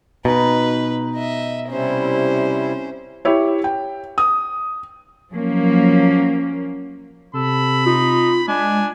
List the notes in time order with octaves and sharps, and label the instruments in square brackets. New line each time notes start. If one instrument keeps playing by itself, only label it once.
[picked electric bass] B2 [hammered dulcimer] D#4 [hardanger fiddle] B4
[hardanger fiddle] D#5 E5
[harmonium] C3 G3 E4 [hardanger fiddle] C#4 C5
[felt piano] E4 G4 C#5
G5
D#6
[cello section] F3 F#3 A#3 C#4
[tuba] C3 [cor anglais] A4 [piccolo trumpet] B5
[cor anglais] D#4 [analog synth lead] F4
[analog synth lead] G#3 [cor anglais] D4 [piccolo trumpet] G#5